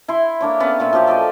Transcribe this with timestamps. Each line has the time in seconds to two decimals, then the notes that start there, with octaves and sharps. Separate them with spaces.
0.08 E4 C6
0.41 A#3 D4 C#5
0.60 B3 C#4
0.80 A#2 F4 E5
0.93 F3 F#3 G4 F5
1.07 A4 D5 D#5 G5